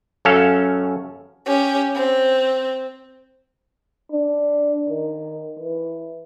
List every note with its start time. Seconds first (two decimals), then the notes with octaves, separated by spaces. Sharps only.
0.25 F#2 C#4 A4 F5
1.46 C#4 G4
1.95 C4
4.12 D4
4.89 D#3
5.59 E3